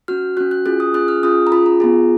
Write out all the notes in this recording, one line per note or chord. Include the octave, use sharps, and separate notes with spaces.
C#4 F#4 F6
C#4 F#4 F#6
F#6
C#4 F4 G#4 F#6
D#6
C#4 F4 G#4 F#6
F6
C#4 F4 G#4 D#6
A#5
C#4 F4 G#4 B5
A#5
B3 F4 G#4